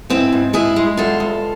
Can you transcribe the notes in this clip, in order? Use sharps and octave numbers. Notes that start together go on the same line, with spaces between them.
G#2 C4 E4
G#2
G#3 E4 G#4
G#3
E2 F4 A4
E2